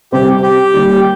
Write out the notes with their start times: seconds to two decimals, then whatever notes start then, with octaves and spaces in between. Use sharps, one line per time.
0.12 C3 G3 C4 G4
0.42 G4
0.74 D#2 D#3 G3